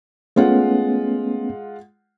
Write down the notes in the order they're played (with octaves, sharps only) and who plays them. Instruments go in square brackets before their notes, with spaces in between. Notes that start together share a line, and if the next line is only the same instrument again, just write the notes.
[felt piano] G#3 F4 F#5 [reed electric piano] A3 B3 C#4